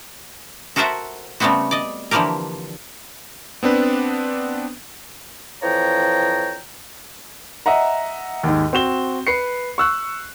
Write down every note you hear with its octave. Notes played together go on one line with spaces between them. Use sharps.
F#4 A4 A#4 C5 E5 F#5
C#3 G3 A3 B3 C4 F#4
D5 D#5
D3 E3 F3 A#3 G4 A#4
B3 C4 D4 B4
F2 E3 F3 C#5 G5 A#5
D#5 E5 F#5 A#5
D#2 G#2
C4 F#4 E7 G7
B4 C7 C#7
C#6 E6 F#6